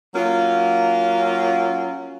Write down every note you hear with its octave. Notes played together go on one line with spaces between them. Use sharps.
F#3 A#3 C#4 F4